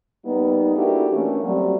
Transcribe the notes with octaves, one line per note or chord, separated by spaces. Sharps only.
G3 A#3 B3 D#4
D4 E4 F#4 G4 A4 A#4
E3 A3 A#3 C#4 D4
F#3 G3 A3 C4 F#4